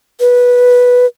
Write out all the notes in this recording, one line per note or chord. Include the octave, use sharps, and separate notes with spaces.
B4